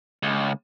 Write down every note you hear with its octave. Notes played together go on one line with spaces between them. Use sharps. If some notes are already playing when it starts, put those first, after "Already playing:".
C#2